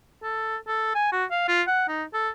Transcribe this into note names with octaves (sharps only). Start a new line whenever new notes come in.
A4
A4
G#5
F#4
F5
F4
F#5
D#4
A4